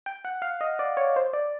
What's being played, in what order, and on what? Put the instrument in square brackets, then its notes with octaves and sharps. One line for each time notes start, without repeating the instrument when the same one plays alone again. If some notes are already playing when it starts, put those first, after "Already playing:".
[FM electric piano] G5
F#5
F5
D#5
D5
C#5
C5
D5